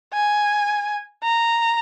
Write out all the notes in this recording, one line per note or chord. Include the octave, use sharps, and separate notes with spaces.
G#5
A#5